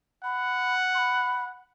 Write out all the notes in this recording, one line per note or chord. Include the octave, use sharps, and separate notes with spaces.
F#5 B5
C6
B5